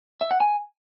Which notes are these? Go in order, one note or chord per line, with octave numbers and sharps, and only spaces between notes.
E5
F#5
G#5